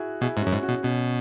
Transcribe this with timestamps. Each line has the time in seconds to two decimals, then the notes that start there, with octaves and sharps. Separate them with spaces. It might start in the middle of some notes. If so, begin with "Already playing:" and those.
Already playing: E4 F#4 G#4
0.21 B2 E4 G#4
0.37 G#2
0.42 C#4 F#4
0.47 F#2
0.53 G#2
0.62 C#4 F#4
0.68 B2
0.83 B2 C#4